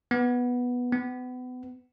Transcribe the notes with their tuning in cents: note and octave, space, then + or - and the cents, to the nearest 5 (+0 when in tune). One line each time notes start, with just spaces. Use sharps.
B3 -5
B3 +30